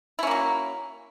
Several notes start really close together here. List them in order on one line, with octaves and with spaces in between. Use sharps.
E4 C#4 A#3 F#3